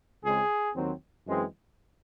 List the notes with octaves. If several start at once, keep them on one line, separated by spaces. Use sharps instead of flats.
C#2 C#3 G#3 C4 G#4
D#2 D#3 F#3 C4
F#2 E3 G#3 C4